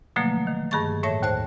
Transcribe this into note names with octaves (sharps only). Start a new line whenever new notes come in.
B2 D3 F3 F#3 A3 A#3
D#3
G2 D#3 G#4 A5 C#6 A6
A2 C#5 E5 A5 A#6
D#2 C5 A5 F#6